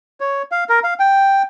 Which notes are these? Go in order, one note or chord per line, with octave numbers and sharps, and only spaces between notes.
C#5
F5
A#4
F5
G5